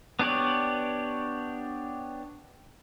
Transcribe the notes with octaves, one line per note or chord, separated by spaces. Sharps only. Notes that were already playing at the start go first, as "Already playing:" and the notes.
B3 D4 G4 C#5 D5